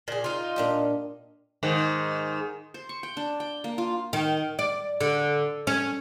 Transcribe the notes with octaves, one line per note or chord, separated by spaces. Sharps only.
A#2 G#4
D#4 F4
A#2 D4 G4
G#2 D#3
C5
C#6
G5
D4
G5
A#3
F4
D#3
D5
D3
C#4